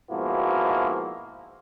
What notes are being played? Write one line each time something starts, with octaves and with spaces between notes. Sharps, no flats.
G#2 B2 F3 A#3 E4 F#4